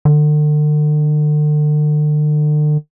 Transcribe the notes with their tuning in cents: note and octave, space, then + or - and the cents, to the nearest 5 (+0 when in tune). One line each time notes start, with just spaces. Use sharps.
D3 +40